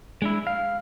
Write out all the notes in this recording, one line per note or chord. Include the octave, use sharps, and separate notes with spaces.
G#3 D4 E4
F5